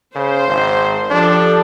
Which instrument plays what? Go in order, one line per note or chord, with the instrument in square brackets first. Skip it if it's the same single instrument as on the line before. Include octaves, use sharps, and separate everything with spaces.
[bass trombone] C#3 [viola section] C5
[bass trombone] G#1
[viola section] F3 G4 A4 [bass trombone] D4